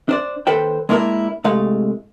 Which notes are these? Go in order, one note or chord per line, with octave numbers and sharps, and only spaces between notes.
D4 C5 D5
D#2 A4 B4 C5 G5
G#3 A#3 D4 E4 G4 A#4
C2 G2 G#3 A3 F5